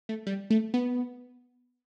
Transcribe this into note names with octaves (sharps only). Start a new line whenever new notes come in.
A3
G3
A3
B3